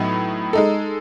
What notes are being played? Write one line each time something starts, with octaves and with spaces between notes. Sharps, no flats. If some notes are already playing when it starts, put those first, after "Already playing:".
Already playing: A2 F#3 B3 D#4
G#3 D#4 A4